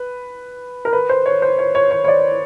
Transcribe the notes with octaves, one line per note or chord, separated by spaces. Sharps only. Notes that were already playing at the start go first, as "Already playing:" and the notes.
Already playing: B4
A#4
B4
C5
C#5
C5
C#5
C#5
C#5
C#5
D5